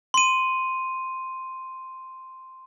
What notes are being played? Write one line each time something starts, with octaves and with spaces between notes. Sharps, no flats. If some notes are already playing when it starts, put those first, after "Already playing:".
C6 D#7